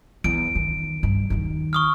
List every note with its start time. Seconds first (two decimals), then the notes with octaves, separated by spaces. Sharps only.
0.24 E2 D7
0.55 D#3
1.03 G2
1.30 D#2 D#3
1.73 C#6 D#6 F6